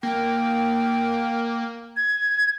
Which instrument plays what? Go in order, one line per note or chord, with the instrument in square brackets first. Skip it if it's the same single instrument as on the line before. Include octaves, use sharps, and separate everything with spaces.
[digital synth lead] A#3 [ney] G5
[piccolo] G#6